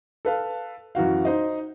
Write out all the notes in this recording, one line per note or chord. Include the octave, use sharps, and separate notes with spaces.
A4 B4 F5
F#2 E3 F#4 F5
D#4 C5 D#5